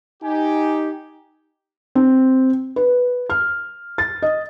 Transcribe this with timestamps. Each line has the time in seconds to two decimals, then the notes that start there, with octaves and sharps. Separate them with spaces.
0.23 D#4 G4 G#5
1.95 C4
2.76 B4
3.30 F6
3.98 A6
4.22 D#5